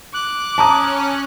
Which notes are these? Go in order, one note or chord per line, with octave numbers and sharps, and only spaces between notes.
D6 F#6
C#4 A5 A#5 D#6